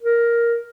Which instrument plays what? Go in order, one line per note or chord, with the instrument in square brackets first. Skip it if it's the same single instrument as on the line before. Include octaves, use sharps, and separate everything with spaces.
[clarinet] A#4